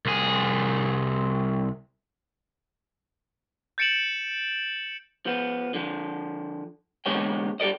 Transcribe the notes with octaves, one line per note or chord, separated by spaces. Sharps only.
C2 G#4
G6 A6 C#7 D7 E7 F#7
F3 B3
D3 F3
E2 A#2 D3 G#3 C#5 G5
G2 G4 A4 D5 D#5